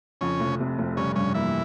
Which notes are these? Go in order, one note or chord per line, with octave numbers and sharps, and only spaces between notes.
F2 C#3 C#4
F1
C3
F1
C#3 G3 C#4
G2 C#3 C#4
E3 A#3 E4